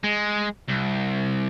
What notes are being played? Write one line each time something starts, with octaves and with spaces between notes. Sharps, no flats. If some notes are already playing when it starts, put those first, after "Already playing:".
G#3
C2